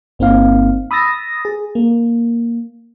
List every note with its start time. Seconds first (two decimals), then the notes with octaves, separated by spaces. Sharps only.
0.19 G1 A#3 C4 D#4 F5
0.91 B5 D#6 E6 A6 A#6
1.45 G#4
1.75 A#3